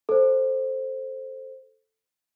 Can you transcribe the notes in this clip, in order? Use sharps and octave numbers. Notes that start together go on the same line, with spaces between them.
A4 C5